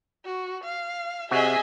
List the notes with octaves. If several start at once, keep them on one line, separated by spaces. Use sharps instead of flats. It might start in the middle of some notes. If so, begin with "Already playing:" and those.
F#4
F5
C3 F#4 G#4 D#5 E5 G#5